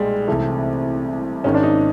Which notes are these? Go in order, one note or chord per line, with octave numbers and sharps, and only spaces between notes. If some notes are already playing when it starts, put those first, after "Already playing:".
Already playing: B1 A#2 G3 G#3
C2 C3 E3 A3
G#1 G#2 D#3 C#4
D4
D#4